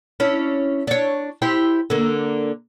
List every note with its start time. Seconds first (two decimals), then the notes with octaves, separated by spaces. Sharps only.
0.20 C#4 D4 E4
0.87 D4 C#5
1.42 E4 G4 C5
1.90 D3 A#3